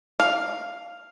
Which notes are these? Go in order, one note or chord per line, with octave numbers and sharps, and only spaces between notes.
F5